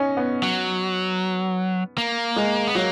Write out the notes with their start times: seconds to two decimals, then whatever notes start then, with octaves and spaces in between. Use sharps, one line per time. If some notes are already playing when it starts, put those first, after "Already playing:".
Already playing: C#4 D#4
0.17 B3
0.43 F#3
1.98 A#3
2.36 G#3
2.67 B3
2.75 F#3 A#3